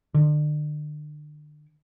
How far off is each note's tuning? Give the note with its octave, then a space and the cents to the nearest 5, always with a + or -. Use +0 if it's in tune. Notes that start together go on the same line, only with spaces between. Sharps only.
D3 +35